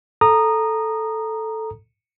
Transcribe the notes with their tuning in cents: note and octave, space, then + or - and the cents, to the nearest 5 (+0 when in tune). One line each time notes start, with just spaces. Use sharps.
A4 +0 A#5 +0 D#6 -20